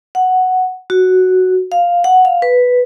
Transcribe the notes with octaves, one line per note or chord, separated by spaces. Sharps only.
F#5
F#4
F5
F#5
F5
B4